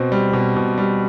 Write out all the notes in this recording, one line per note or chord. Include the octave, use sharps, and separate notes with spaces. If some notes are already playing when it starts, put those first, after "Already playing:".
Already playing: B2 C4
G3
B2
B2
G3